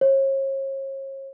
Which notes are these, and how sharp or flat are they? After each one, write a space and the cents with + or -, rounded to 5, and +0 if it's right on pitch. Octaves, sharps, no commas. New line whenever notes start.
C#5 -40